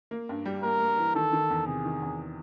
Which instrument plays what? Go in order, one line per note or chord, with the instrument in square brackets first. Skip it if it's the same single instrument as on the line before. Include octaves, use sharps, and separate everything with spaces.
[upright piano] A#3
G2
G3
[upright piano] A#3 [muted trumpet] A#4
[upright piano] A#3
E3
[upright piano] D#3 [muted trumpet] A4
[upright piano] D#3
E2
[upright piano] C3 [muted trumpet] G#4
[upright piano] D#3
E2